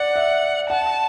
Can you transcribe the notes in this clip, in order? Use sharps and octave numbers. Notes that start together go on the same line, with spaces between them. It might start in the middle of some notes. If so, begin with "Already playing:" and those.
Already playing: D5 F#5
E5
F#5 A5